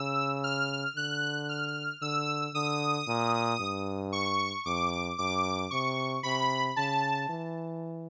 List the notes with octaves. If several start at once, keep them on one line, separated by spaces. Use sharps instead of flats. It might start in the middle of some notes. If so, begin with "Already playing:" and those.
Already playing: C#3 E6
F6
D3 F#6
F6
D3 E6
D3 D#6
A#2
G2
C#6
F2 D6
F#2 D6
C3 C#6
C3 B5
C#3 A5
E3